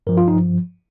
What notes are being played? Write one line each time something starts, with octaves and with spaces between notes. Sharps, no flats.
G2 F3 A#4
F4
D#4